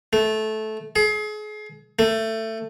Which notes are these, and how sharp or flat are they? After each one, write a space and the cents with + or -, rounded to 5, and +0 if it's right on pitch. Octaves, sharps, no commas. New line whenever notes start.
A3 -15
G#4 +35
A3 +20